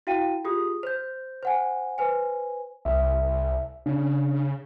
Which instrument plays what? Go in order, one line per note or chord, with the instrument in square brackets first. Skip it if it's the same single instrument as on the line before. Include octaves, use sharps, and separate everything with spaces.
[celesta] E4 F#4 F5 G5 D#7
F4 G4 G#4 D#6
C5 G6
C5 F#5 G#5
B4 C5 G#5
[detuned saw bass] C2 [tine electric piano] E5
[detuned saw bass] C#3 [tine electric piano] D4